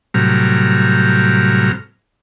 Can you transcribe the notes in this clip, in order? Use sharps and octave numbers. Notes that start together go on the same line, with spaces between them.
A2 C3 F#3 G3 A#5 F6